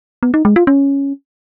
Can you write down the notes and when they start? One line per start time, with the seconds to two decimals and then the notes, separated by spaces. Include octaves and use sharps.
0.23 B3
0.34 D#4
0.45 G#3
0.56 F4
0.67 C#4